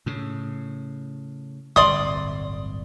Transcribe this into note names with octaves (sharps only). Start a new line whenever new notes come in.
A2 C#3
D1 G1 C2 D5 C6 D#6